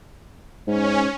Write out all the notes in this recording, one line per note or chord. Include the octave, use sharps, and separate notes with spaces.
G#2 C#4